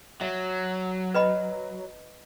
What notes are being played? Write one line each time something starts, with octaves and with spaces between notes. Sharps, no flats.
F#3 E5
B4 D#5 B5